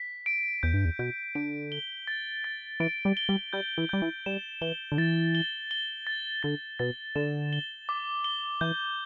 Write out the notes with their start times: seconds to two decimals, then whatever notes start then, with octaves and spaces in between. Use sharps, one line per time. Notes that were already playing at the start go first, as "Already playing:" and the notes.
Already playing: B6
0.26 D7
0.63 E2 G6
0.74 G2
0.85 E2
0.99 B2 G6
1.35 D3 D7
1.72 G7
2.07 A6
2.44 A6
2.80 E3 D7
3.05 G3
3.17 G7
3.29 G3
3.53 G3 G6
3.78 E3
3.89 G3 G6
4.02 E3
4.26 G3 E7
4.61 E3 G7
4.92 D3
4.98 E3 A6
5.35 G7
5.71 G7
6.07 A6
6.43 D3 A6
6.79 B2 A6
7.15 D3 E7
7.53 G7
7.89 D6
8.24 G7
8.61 E3 G6